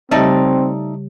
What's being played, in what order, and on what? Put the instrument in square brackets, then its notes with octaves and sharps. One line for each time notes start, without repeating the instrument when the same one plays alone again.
[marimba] C#3 G3 G4 [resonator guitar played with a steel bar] A3 D#4 D5 [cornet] C4